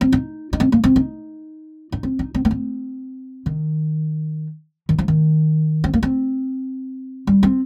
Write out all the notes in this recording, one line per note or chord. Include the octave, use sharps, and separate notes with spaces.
C4
D#4
D#4
C4
A#3
C4
D#4
D#4
C4
D#4
C4
A#3
C4
D#3
D#3
F3
D#3
C4
A#3
C4
G3
C4